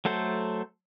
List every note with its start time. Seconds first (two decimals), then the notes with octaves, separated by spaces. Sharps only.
0.05 F#3 A3 A4 C5